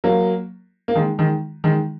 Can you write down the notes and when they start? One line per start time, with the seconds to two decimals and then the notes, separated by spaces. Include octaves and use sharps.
0.04 F#3 A#3
0.88 A#3
0.95 D#3 G#3
1.18 D#3 G#3
1.64 D#3 G#3